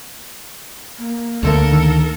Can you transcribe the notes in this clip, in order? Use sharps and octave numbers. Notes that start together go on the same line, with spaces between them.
A#3
D2 D3 A3 A4 A#4
D#3